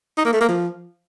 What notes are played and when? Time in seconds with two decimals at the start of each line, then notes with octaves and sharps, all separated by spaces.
0.17 D#4
0.25 A#3
0.33 A3
0.41 A#3
0.49 F3